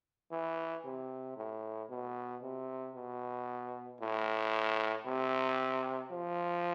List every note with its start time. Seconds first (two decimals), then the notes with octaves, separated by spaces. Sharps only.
0.32 E3
0.85 C3
1.37 A2
1.90 B2
2.43 C3
2.96 B2
4.01 A2
5.06 C3
6.12 F3